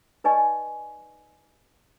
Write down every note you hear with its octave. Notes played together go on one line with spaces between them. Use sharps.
D#4 B4 D5 D#5 G#5 C#6